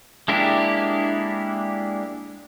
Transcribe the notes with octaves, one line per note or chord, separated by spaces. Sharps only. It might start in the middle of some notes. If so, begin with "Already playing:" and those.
G#3 A#3 D4 E4 G4